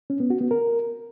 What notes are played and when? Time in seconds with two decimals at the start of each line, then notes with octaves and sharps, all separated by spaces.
0.10 C#4
0.20 B3
0.30 F#4
0.41 B3
0.51 A#4